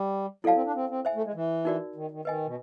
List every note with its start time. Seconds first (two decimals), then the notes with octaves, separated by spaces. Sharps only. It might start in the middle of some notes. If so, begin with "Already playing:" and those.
Already playing: G3
0.44 F#3 E4 A4 D5 F5 A5
0.55 C4
0.65 D4
0.75 C4
0.90 C4
1.05 C5 E5 G#5
1.15 A3
1.25 G#3
1.35 E3
1.65 D#4 F#4 A#4 D5
1.96 D#3
2.11 D#3
2.25 D#3 B4 D#5 G#5
2.46 B2